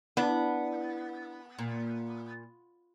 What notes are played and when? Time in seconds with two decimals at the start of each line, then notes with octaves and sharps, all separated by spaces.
0.17 B3 D4 E4
1.59 A#2